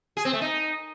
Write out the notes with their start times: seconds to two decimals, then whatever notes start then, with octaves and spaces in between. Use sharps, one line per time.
0.17 G#4
0.25 C4
0.33 A3
0.41 D#4